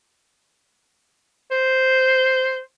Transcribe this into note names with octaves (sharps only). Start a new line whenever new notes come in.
C5